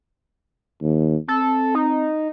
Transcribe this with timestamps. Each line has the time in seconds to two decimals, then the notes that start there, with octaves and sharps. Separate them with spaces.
0.82 D#2
1.28 C4 A4
1.75 D#4